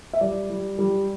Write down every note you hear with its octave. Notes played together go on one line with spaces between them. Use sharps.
E5
G3 D5
G3
G3